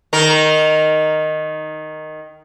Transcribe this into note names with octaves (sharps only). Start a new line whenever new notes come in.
D#3 A#4